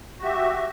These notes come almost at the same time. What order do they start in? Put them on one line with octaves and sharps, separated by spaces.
F#4 G4 E5